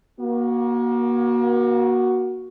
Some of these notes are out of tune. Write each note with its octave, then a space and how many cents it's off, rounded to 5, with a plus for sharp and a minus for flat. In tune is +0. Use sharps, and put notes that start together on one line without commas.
A#3 +35 F#4 +5